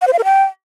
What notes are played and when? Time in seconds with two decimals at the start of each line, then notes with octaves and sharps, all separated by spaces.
0.02 F#5
0.07 C5
0.13 F5
0.19 A#4
0.24 G5